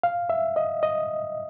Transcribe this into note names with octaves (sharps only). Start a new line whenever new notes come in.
F5
E5
D#5
D#5